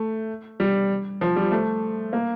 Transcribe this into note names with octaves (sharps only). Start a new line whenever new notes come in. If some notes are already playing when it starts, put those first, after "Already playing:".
Already playing: A3
G3
F3
G3
A3
A#3